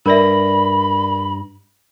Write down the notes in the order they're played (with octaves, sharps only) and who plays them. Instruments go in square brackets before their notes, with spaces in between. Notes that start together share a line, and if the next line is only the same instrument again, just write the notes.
[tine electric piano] G2 A#6 [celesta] A#4 D5 E5 [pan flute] B5